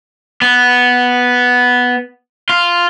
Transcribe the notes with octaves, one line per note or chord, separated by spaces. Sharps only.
B3
F4